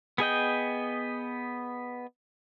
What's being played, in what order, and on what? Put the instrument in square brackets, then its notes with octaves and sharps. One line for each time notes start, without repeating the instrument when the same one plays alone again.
[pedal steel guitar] B3 G#4 D#5 G5